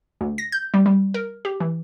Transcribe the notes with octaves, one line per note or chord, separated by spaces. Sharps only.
D2
A#6
G6
G3
G3
A#4
G4
E3